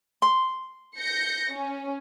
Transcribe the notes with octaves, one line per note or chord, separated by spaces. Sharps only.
C6
G6 A#6 C#7
C#4